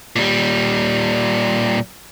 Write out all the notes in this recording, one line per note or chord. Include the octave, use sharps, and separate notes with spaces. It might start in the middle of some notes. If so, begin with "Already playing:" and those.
A#2 G3